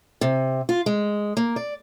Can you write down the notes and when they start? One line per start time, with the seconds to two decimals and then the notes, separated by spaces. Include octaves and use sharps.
0.21 C3
0.69 F4
0.86 G#3
1.37 A#3
1.56 D5